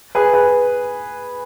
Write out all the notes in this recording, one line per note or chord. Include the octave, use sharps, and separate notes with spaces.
G#4 B4
G#4 B4